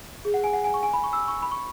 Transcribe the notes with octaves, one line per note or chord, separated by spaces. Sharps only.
G#4
F#5
G#5
F#5
G#5
C#6
G#5
B5
C#6
E6
C#6
B5
C#6